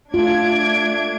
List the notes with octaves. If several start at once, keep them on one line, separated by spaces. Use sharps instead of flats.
A3 D4 F4 G#6 D7